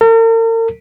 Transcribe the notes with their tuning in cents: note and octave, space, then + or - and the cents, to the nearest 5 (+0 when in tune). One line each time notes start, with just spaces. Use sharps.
A#4 -45